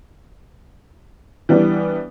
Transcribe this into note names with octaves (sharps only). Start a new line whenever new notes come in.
E3 G3 B3 D4